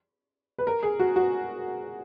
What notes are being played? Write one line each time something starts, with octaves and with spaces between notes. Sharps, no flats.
B4
A#4
G#4
F#4
F#4